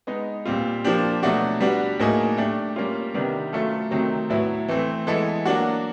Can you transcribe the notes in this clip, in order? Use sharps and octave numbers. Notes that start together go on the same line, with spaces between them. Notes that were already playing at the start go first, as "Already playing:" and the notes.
G#3 B3 D#4
A#2 G3 C4 F4
F3 A#3 D4 G4
B2 F#3 A3 D4 F#4
G3 B3 D4 F#4
A2 F#3 A#3 D#4 G#4
A3 D4 G4
G3 A#3 C#4 F4
C3 D#3 G3 B3 D4
F#3 A3 C#4 F4 A4
C3 D#3 F#3 A3 C4
A2 F#3 B3 E4
E3 A3 C4
E3 G#3 B3 E4 A4
F#3 A#3 D4 F#4